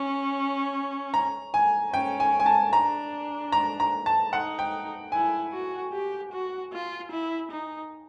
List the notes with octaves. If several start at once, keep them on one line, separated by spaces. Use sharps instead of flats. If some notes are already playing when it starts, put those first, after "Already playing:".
Already playing: C#4
A#5
G#5
C#4 G5
G#5
G#5
A5
D4 A#5
A#5
A#5
A5
D#4 F#5
G5
E4 G#5
F#4
G4
F#4
F4
E4
D#4